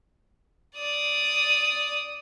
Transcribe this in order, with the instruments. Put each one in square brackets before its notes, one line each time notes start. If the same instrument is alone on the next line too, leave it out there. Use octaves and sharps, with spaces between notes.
[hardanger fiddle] D5 D#6